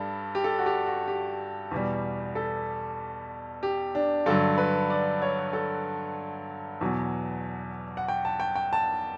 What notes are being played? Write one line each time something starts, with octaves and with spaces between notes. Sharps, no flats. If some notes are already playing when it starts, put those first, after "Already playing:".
Already playing: G2 G3 A4
G4
A4
F#4
G4
F#4
G4
E2 B2 G3
A4
G4
D4
G2 D3 F#3 A4
B4
D5
C#5
A4
E2 B2 F#3
F#5
G5
A5
G5
G5
A5